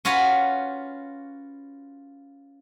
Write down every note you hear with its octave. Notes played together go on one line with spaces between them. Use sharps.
C#4 F4 F#4 B4 C#5 B5